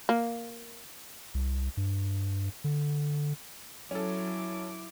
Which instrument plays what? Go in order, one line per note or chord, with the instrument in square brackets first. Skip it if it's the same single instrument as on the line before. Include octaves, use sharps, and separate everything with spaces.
[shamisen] A#3
[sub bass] C2
G2
D3
[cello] F#3 [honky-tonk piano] C#4 A4 [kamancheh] E4 D6